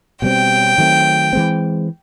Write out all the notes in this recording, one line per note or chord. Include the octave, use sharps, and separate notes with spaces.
B2 G3 C4 G5
D#3 F#3 A3 C4
E3 G#3 C4